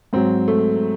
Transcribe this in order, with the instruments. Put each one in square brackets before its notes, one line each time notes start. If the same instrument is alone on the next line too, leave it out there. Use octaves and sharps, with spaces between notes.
[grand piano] G#2 F#3 C4
A3